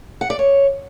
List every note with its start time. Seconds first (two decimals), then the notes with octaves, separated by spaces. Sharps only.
0.21 F#5
0.30 D5
0.39 C#5